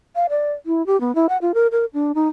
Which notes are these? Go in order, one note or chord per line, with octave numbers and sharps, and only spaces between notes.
F5
D5
E4
G4
B3
E4
F#5
F4
A#4
A#4
D4
D#4